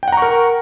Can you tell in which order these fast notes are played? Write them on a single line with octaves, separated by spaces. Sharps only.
G5 F#5 A#5 C#6 A#4